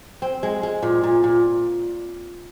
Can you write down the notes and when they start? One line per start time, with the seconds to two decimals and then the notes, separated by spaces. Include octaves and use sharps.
0.22 C4
0.43 G#3
0.63 G#3
0.83 A#2
1.03 A#2
1.24 A#2